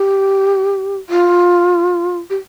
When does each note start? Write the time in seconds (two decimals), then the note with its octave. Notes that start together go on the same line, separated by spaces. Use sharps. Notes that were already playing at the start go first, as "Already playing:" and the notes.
Already playing: G4
1.10 F4
2.30 G4